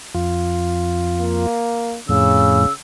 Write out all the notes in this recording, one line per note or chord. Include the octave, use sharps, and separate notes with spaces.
F2 F4
A#3
F2 A2 C#3 E6